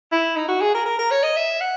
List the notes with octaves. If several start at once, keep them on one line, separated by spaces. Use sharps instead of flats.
E4
D#4
F#4
G#4
A#4
A#4
A#4
C#5
D#5
E5
F#5